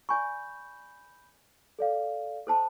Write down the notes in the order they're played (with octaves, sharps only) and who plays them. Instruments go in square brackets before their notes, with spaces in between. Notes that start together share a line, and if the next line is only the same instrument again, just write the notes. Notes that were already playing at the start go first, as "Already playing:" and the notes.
[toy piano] D5 G#5 C#6 [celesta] B5 G6
[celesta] A4 D5 F5
[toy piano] A4 C5 A5